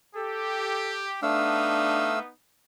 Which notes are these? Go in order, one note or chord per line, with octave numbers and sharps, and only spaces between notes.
G4 A4
A3 B3 D4 D#4 F5 E6